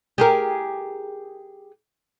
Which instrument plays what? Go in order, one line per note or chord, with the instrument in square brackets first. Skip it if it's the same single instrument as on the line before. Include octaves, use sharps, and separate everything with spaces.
[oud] G4 G#4 A#4